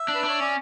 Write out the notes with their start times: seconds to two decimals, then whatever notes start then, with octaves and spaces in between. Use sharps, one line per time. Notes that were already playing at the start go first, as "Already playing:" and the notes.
Already playing: E5
0.08 D4
0.15 B4
0.24 D4
0.29 C#5
0.40 C#4 D5